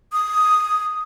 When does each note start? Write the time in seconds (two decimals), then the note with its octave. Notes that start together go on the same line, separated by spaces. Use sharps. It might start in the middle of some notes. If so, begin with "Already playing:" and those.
0.12 D#6